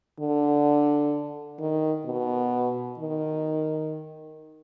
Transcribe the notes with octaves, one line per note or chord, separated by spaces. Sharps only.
D3
D#3
B2
D#3